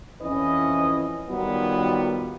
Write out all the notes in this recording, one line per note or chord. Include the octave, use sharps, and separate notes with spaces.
F2 E3 C#4 B4 D#5
D#3 F#3 G3 B3 F4